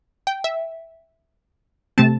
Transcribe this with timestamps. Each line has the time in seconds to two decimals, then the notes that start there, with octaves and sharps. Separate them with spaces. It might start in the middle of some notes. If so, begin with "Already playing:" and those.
0.27 G5
0.44 E5
1.98 C3 A3 C4 A5